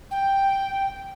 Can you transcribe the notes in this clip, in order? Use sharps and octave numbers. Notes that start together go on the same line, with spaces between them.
G5